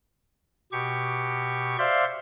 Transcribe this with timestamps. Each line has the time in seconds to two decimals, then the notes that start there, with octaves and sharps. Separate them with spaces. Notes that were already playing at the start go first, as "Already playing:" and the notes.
0.72 B2 G4 C#6
1.78 C5 D5 E5 F5 C6